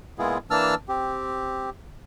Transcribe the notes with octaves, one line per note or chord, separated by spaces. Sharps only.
A#2 G#3 B3 E4 F4 G#4
E3 A#3 D4 A5 E6 F6
C4 G4